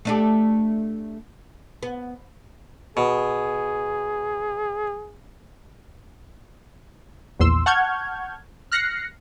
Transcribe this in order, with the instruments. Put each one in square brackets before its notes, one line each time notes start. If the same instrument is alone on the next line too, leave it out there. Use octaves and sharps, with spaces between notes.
[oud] A3 D4 G4
B3
[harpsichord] B2 [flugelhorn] G#4
[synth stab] A#1 E2 C6 E6
F#5 A5 C#6 F6 G6 G#6
F6 F#6 A#6 C7 C#7